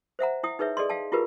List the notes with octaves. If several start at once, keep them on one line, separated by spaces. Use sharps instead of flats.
C5 E5 F#5 A#5
E4 G5 D#6
D#4 G#4 B4 C#5 E5
G#4 A4 D5 D#5 C6
F5 G5 A5
E4 F4 G4 G#4 A#4 B4